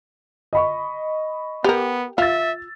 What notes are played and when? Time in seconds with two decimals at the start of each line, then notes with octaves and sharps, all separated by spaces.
0.53 D#5 B5 C#6
1.64 B3 G4 A#4
2.18 F4 E5 E6 A6